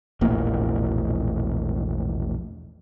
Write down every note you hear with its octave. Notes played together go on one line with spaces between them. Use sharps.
E1 A#1 A2 A#3